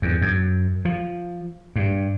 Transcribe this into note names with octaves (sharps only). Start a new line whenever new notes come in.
E2
F#2
F3
G2